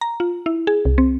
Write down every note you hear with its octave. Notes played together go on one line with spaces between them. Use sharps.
A#5
F4
E4
G#4
C2
C4